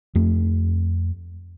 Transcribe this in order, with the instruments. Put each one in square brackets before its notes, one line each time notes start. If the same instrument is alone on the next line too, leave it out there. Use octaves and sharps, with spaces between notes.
[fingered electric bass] F2 A3